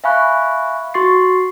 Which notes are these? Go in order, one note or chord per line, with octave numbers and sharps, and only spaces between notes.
E5 F5 G#5 B5 C#6 F#6
F#4 C6 C#6 A6 C7